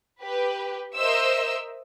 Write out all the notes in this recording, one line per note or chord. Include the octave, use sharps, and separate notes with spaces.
G4 B4
A#4 C5 D#5 E5 E6